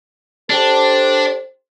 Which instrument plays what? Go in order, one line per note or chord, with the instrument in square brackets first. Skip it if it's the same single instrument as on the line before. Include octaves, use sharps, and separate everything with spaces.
[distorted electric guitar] D4 [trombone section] G4 A4 C5